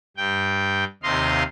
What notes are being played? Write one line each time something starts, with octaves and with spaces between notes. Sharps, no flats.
G2 G5
D#2 C3 D#5 F5 C6